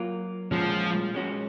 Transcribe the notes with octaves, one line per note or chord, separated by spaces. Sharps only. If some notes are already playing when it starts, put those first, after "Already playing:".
Already playing: F#3 A#3 F4
A#2 F3 G#3 C#4 F#4
G#3 C#4 F#4